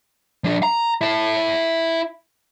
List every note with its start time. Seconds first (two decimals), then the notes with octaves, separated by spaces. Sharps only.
0.44 F3 D4
0.63 A#5
1.01 E4 A5